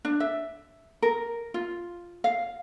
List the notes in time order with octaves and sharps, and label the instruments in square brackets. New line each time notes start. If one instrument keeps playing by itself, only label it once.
[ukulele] D4
E5
A#4
F4
F5